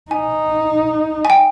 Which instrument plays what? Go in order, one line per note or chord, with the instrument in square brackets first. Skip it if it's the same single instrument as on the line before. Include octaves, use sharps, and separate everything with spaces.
[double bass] D#4 [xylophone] G#5
[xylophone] G#5
G5